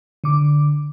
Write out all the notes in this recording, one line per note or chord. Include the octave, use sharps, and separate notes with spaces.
D3 D6